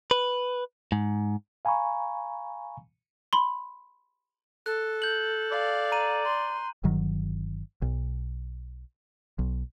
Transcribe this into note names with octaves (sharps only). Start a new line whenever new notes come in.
B4
G#2
F5 G#5 A#5 B5 C#6
B5 C6
A4 F#6
G6 F#7
D5 F5
A#5 D#7
C6
G1 G2 D#3 F#3
B1
B1